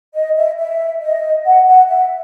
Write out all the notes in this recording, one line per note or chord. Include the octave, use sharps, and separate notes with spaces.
D#5
E5
E5
D#5
F#5
F#5
E5